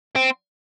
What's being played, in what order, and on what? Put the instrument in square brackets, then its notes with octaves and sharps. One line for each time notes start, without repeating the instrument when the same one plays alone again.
[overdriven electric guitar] C4